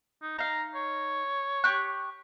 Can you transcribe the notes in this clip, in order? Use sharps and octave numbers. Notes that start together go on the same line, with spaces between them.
D#4
D#4 F5 A#5
C#5
G4 C#6 F#6